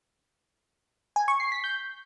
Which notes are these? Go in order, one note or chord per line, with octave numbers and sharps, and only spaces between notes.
G#5
C#6
C7
B6
G6